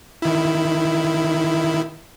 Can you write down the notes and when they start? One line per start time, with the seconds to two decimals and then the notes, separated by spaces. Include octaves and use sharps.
0.22 D#3 E4